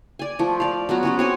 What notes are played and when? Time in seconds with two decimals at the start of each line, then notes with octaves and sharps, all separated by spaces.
0.19 D5 G#5
0.39 F3 A3
0.60 D5 F5
0.89 F#3 B3 F#4
1.03 C#4 F#4 G4
1.19 C4 C#5 G#5